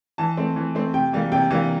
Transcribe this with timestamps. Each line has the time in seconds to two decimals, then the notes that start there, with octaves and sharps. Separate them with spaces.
0.18 E3 A5
0.37 A3 C4
0.56 E3
0.75 A3 C4
0.94 C3 G5
1.13 E3 G3 A#3
1.32 C3 G5
1.50 E3 G3 A#3